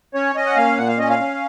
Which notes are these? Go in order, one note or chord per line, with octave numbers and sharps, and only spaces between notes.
C#4 C#5
C#4 D#5
F#5
A#3 F5
A#2 F#5
F5
C#4 D#5
F5
C#4